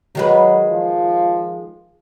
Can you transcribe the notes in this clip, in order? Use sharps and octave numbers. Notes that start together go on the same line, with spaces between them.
D#3 F#3 G#3 B4
F3